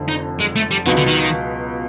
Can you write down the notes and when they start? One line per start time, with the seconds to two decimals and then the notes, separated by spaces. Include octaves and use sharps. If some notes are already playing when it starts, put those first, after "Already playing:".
Already playing: F1 F2 D3
0.08 D#4
0.40 G#3
0.56 A3
0.71 G3
0.86 C#2 B2 D#3 F#3 B3
0.97 D3
1.07 D#3